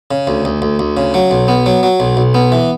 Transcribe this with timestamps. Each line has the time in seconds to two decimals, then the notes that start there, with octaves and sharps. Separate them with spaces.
0.11 C#3
0.27 D2
0.45 D2
0.62 D2
0.79 D2
0.97 C#3
1.14 F#3
1.31 B1
1.48 B3
1.66 F#3
1.83 F#3
2.00 B1
2.17 B1
2.34 B3
2.52 E3